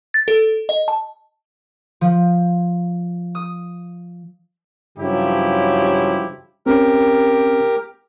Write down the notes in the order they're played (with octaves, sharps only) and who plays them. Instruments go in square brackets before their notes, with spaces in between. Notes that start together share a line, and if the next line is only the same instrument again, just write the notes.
[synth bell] A6
A4
D#5
A5
[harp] F3
D#6
[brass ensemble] G2 C#3 F3 F#3 E4 G4
[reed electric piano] C4 C#4 [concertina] G4 A#4